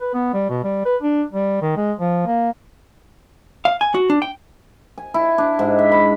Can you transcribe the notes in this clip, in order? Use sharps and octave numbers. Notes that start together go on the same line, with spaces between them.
B4
B3
G3
B2
G3
B4
D4
G3
D#3
G#3
F3
A#3
F5
G#5
F#4
D4
G5
G#5
E4
D4
G#2
E5
B5